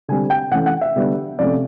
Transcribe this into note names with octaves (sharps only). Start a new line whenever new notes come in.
D3 G3 C4 G#5
G5
E3 A3 C#4 F#5
F#5
E5
D3 G3 B3 D4
C3 F3 A3 C#4 D5